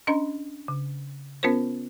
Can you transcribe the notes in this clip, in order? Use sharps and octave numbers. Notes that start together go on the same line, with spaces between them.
C#4 D4 D#5 A#5
C#3
B3 C#4 F4 A#4 C5